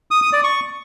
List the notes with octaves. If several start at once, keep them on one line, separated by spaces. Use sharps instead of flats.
D#6
D#6
D5
C#6